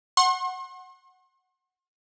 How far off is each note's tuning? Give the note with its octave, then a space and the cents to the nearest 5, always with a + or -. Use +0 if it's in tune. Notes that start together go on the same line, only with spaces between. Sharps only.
F#5 +0 C6 +40